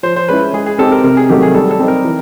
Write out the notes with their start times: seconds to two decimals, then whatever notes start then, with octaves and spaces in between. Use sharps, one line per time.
0.03 F3 C5
0.16 C5
0.29 G#3 C#4 E4 B4
0.53 G#3 G#4
0.66 G#4
0.78 C4 D#4 G4 A4
0.92 A#4
1.04 C3 A#4
1.17 G#4
1.29 D#3 F#3 A3 G4
1.42 G#4
1.54 G3 A4
1.71 A4
1.79 C4 D#4 G4
1.88 A#4
2.05 E3